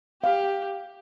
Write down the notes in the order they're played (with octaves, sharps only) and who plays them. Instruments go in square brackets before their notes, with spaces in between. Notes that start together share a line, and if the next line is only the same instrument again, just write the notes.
[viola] G4 [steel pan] F5